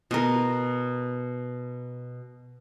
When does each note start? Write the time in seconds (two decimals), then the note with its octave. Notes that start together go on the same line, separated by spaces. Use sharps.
0.11 B2 A#4